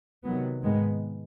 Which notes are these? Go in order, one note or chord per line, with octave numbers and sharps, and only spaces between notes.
C3 D#3 F#3 B3
G#2 D#3 G#3 B3